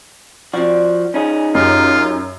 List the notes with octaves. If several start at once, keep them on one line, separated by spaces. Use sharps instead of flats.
F3 C4 F#4 D5
C#4 D#4 G#4
F#2 F4 G4 A#4 D#5